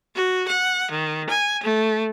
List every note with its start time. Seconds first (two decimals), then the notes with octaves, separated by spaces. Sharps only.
0.15 F#4
0.48 F#5
0.91 D#3
1.28 G#5
1.62 A3